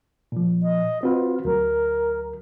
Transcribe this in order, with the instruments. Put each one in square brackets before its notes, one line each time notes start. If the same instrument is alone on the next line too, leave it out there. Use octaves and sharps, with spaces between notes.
[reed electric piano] A#2 F3
[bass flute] D#5
[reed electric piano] C4 F#4 B4 [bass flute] F4
[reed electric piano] D2 F#3 [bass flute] A#4